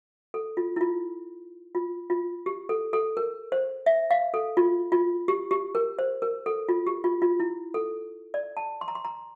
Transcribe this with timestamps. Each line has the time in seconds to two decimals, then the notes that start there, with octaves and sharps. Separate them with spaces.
0.34 A4
0.57 F4
0.76 E4
0.81 F4
1.75 F4
2.10 F4
2.46 G4
2.69 A4
2.93 A4
3.17 A#4
3.52 C5
3.86 E5
4.11 F5
4.34 A4
4.57 F4
4.92 F4
5.28 G4
5.51 G4
5.75 A#4
5.99 C5
6.22 A#4
6.46 A4
6.69 F4
6.87 G4
7.04 F4
7.22 F4
7.40 E4
7.74 A4
8.34 D5
8.57 A5
8.81 C6
8.88 A#5
8.95 C6
9.05 A#5